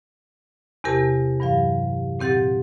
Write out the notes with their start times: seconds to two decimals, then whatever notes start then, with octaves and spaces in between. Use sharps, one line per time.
0.84 E2 C3 G4 A#4 A5
1.40 G2 E3 F#3 F5
2.19 A#2 C4 G4 F#5 A6